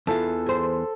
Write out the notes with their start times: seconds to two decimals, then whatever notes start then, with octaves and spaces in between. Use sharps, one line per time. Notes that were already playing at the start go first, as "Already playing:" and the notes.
0.07 E2 E3 F4 A4
0.46 G#4 C5